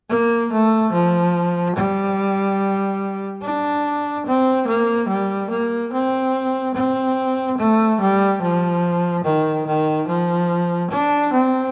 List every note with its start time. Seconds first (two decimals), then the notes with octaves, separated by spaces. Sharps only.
0.09 A#3
0.52 A3
0.93 F3
1.76 G3
3.42 D4
4.26 C4
4.68 A#3
5.08 G3
5.50 A#3
5.93 C4
6.74 C4
7.58 A3
8.00 G3
8.41 F3
9.24 D#3
9.67 D#3
10.07 F3
10.91 D4
11.33 C4